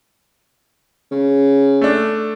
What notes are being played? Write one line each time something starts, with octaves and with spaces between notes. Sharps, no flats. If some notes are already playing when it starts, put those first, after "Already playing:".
C#3
A3 D4